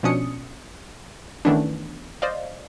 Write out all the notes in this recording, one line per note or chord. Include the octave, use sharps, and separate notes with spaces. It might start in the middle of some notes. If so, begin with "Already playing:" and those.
B2 F3 C#4 D4 D#6 C#7
D#3 E3 A3 B3 C#4 D4
C5 D5 D#5 F5